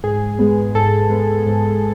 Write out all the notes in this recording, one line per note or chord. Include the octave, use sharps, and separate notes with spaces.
G#2 G#4
G#3 B3
G#2 A4
G#3 B3
G#2